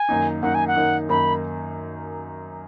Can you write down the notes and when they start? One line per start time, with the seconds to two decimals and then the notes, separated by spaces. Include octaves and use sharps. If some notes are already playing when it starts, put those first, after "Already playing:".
Already playing: G#5
0.09 F#2 D#3 A#3 D#4
0.42 F#2 D#3 A#3 D#4 F#5
0.55 G#5
0.67 F#5
0.76 F#2 D#3 A#3 D#4
1.09 F#2 D#3 A#3 D#4 B5